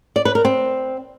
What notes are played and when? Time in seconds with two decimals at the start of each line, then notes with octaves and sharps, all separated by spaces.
0.16 D5
0.25 B4
0.35 A#4
0.45 C4